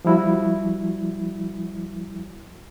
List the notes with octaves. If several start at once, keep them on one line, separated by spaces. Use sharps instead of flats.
F3 G3 E4 F#4